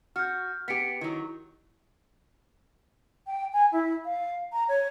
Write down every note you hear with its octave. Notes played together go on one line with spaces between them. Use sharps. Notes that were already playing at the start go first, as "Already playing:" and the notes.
F#4 F6 G6
B3 G4 B6 C#7 D7
D#3 F#3 E4
G5
G#5
E4
F5
A#5
C#5